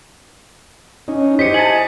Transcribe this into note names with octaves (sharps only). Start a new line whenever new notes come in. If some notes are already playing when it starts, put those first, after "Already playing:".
C#4 D#4
E4 G4 C5 D#5 B6 C#7
G#5 A5 F#7